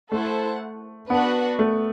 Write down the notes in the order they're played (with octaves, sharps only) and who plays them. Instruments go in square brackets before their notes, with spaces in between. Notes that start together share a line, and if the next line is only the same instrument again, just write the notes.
[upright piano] A3 [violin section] E4 A4 C5 F#5 A5
[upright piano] B3 [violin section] D4 F#4 B4 F#5
[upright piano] A3